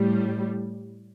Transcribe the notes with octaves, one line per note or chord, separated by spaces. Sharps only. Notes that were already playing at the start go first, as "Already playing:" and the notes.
Already playing: A2 G3